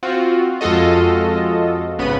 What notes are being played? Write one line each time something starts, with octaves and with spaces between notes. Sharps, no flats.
C4 F4 F#4
F2 G#3 F4 F#4 A4 D#5
G#1 C#3 B3 B5 D#7